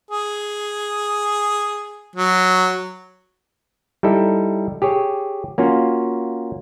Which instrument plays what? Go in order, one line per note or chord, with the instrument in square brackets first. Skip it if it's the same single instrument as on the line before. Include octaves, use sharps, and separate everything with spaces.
[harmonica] G#4
F#3
[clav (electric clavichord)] G3 D#4 E4 A4
G4 G#4 C#5
A#3 C#4 F4 F#4